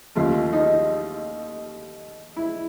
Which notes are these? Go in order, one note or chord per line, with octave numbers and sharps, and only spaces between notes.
D#2 C#3 F3 A3 F4
D#4
E4